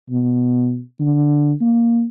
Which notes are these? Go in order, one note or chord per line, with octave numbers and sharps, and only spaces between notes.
B2
D3
A#3